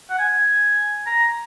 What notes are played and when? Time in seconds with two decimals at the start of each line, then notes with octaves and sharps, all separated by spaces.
0.10 F#5
0.19 G#5
1.06 A#5